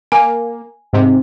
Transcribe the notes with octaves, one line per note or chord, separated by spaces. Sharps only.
A#3 G#5
G#2 C3